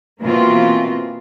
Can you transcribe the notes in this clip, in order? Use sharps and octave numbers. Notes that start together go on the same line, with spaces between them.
B2 E3 A#3 C4 F4